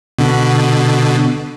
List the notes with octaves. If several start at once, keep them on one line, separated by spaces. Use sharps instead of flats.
B2 D3